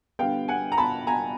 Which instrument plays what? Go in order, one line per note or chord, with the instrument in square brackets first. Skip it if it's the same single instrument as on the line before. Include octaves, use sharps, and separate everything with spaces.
[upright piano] D3 G3 B3 F5 G5
F#5 G#5
A#5
A5 B5
G#5 A#5